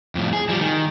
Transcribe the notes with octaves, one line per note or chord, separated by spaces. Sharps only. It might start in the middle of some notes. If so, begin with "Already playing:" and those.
F2 A2
G#4
F3 G3
D#3